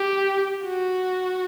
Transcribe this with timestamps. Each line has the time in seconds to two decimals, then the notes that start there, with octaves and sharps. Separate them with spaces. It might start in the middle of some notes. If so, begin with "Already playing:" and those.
Already playing: G4
0.64 F#4